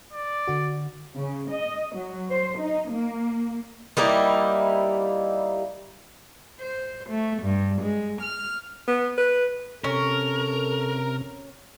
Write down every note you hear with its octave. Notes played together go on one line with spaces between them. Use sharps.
D5
D3 F#4
C#3
D#5
F#3
C5
D#4
A#3
G3 A#3 D#4 E4
C5
A3
G2
G#3
F6
B3
B4
C3 C#4 A4 A#4